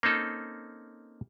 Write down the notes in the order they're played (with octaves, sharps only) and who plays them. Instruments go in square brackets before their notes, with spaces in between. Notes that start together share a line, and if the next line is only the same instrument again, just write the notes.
[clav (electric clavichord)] A#3 C4 C#4 D#4 A4